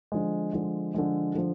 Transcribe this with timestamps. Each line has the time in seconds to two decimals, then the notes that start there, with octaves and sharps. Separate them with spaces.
0.12 D3 F3 G#3
0.53 D3 F3 G#3
0.94 D3 F3 G#3
1.35 D3 F3